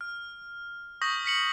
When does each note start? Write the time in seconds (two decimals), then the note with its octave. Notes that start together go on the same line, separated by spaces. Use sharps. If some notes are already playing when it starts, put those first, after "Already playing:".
0.01 F6
1.02 C#6 D#6 G6 A#6 B6 F#7
1.25 F6 B6 C#7 F#7